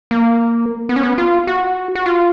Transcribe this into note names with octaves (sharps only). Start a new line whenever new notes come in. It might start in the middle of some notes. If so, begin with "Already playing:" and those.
A#3
B3
C#4
B3
F4
F#4
F#4
F4